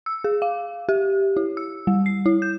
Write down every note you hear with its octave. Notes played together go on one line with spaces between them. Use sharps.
E6
G#4
F5
G4
E4
E6
G3
C7
E4
G6